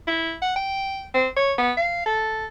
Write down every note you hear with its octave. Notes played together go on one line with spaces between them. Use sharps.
E4
F#5
G5
C4
C#5
B3
F5
A4